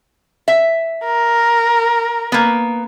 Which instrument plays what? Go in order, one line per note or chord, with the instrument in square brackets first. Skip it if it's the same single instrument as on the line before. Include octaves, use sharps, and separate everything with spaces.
[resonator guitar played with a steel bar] E5
[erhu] A#4
[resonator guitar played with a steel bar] A#3 B3